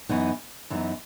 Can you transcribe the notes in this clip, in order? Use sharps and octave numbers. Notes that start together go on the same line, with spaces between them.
F#2 E3 B3 D#4
F#2 E3 B3 D#4